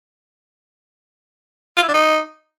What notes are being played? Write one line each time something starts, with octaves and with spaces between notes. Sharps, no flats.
F4
E4
D4
D#4